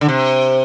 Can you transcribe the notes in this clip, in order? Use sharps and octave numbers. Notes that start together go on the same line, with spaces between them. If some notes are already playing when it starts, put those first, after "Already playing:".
D3
C3